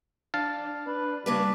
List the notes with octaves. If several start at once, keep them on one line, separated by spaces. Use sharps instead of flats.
D4 F5 A5
D4 B4
C#3 G3 A#3 D4 B4